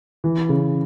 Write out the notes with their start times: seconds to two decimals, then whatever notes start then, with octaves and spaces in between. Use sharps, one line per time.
0.24 E3
0.49 C#3